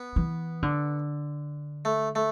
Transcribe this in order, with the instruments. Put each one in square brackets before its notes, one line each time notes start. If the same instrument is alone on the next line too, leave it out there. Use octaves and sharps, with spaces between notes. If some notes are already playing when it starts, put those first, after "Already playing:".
Already playing: [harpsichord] B3
[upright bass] E3
D3
[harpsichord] A3
A3